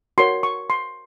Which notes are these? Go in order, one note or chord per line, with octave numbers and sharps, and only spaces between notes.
F#4 A#4 C#5 C6
C#6
C6